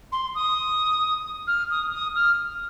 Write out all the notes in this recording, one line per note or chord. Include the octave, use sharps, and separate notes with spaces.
C6
D#6
F6
D#6
D#6
F6